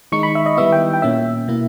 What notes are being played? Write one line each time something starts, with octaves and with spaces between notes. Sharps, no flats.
D#3 G#3 D#4 C#6
B5
E5
D#5
D#3 G3 B3 E4 E5
G5
G5
A#2 A#3 C#4 E5
B2 A#3 E4